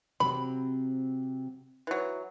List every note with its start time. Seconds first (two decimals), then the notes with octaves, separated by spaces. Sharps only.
0.20 C3 F#3 C4 B5
1.87 E3 F#3